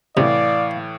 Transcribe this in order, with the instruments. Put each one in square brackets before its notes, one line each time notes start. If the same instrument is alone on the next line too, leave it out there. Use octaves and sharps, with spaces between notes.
[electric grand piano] A2 E3 [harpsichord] C3 [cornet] D5 [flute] F5